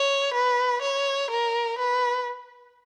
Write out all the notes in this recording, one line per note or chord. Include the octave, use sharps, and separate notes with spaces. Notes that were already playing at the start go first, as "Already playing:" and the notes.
Already playing: C#5
B4
C#5
A#4
B4